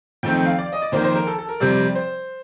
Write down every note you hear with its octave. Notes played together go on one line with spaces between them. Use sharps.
F2 D#3 A3 C4 G5
F5
D5
D#5
D5
F2 D#3 A#3 C5
C5
A#4
A4
A4
A#4
F2 C3 G3 C4 D5
C5